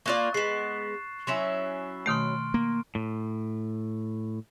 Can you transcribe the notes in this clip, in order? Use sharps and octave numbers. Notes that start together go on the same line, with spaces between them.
A#3 F4 D5 C#6 F#6 A6
G#3 B3 C7 E7
F#3 C#4 E4 C6
B2 D#3 A3 C6 F6 D7
A#3
A2